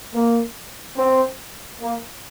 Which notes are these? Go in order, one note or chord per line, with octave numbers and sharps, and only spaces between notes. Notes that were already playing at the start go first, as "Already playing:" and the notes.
A#3
C4
A#3